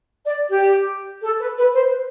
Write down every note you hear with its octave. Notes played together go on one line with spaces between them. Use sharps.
D5
G4
A4
B4
B4
C5